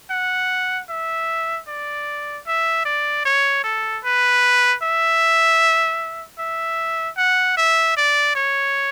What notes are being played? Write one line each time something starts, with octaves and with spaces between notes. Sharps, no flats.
F#5
E5
D5
E5
D5
C#5
A4
B4
E5
E5
F#5
E5
D5
C#5